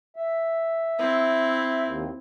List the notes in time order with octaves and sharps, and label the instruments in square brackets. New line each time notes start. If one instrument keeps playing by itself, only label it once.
[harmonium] E5
[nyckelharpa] C4 E4
[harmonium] D#2